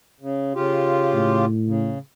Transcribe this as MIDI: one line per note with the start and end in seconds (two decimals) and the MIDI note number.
0.20 0.53 49
0.55 1.45 49
0.55 1.45 65
0.55 1.45 67
1.14 1.94 45
1.67 1.98 49